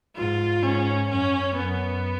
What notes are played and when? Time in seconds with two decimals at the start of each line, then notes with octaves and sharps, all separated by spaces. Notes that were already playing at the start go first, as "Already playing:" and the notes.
0.16 G#2 F4
0.62 G#2 C#4
1.09 F#2 C#4
1.56 F#2 B3